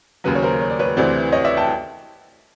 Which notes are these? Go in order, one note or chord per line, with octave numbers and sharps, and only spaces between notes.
D#2 C#3 F#3 B4
C#5
A#4 C5
C#5
D5
B4 C#5
D2 C3 E3 C5 D5
C#5 D#5
D5 E5
G5 A5